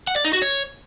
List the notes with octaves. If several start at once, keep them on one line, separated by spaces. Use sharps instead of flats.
F#5
D5
D#4
F#4
C#5